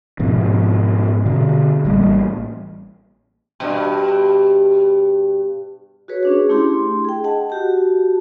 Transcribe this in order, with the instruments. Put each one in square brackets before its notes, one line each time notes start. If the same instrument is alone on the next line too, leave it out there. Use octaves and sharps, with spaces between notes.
[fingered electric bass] G#2 B2 F3
B2 D3
A1 G3 A#3
[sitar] G2 B2
[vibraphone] F#4 G#4 B4 C#5
C#4 D4 G#4
A3 D4 E4 G4 C6
G#4 G5
D#5 F#5 A5
F#4 G4 A5